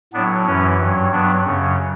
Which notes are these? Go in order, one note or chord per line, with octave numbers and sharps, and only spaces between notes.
A2 F#3 B3 D4
F#2 E3 C#4
G2 F#3
G2 F#3 B3 D4
F#2 C#3 F#3